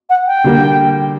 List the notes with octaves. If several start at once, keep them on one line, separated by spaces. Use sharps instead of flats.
F#5
G5
D3 G3 A#3